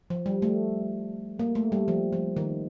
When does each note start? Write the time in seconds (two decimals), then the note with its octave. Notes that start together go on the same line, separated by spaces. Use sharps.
0.10 F3
0.26 G3
0.42 A3
1.39 A#3
1.55 A3
1.72 G3
1.88 F3
2.13 F3
2.37 D#3